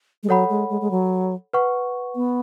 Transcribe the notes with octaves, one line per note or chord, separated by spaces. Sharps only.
G#3
F#3 A4 C#5 F#5 B5
G#3
G#3
G#3
F#3
B4 F#5 C#6
B3